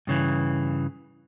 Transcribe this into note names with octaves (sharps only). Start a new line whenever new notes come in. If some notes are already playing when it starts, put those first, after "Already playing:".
G2 C#3 E3